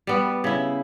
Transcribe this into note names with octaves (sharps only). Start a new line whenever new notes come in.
G3 B3
C#3 E4